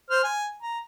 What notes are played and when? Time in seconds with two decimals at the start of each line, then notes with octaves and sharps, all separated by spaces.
0.10 C5 F6
0.24 G#5
0.62 A#5